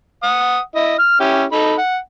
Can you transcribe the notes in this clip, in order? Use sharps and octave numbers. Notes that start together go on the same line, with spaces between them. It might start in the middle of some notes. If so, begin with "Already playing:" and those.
F#5 D#6
E4 D#5
F6
C#4 E4 G4
D#4 A4 B5
F#5